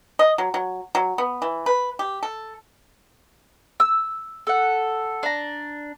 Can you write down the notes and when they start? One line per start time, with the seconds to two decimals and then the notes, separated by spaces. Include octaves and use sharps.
0.19 D#5
0.38 F#3
0.54 F#3
0.95 F#3
1.18 B3
1.42 E3
1.66 B4
1.99 G4
2.23 A4
3.80 E6
4.47 A4 F#5
5.23 D4 A#5